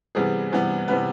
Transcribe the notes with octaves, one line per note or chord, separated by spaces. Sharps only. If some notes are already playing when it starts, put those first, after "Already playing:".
C3 E3 G3 B3 G#4
C3 E3 G3 B3
C3 E3 G3 B3 B4